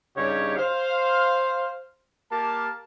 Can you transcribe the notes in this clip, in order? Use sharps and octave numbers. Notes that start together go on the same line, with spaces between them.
G2 C#3 D#4 G4 C#5
C5 F5
A#3 G4 A#4 A5